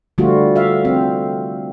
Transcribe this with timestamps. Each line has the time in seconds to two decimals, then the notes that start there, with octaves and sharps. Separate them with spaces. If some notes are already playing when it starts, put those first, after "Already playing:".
0.18 D3 F3 G3 A3 F4 F#4
0.56 E5 F5
0.85 F3 C4